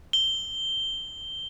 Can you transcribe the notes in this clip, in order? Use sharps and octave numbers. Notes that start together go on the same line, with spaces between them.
G7